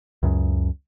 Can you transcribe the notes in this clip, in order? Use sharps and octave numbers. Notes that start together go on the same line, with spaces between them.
C#2 F#2 C#3